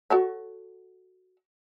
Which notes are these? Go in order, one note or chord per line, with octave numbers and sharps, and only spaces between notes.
F#4 A4 C#5